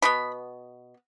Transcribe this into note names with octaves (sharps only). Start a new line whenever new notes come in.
B2 B3 B5